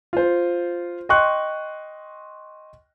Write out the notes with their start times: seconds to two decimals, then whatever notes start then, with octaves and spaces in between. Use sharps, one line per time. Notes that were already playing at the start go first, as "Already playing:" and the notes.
0.13 F4 C5
1.09 D#5 G5 C6 C#6 F#6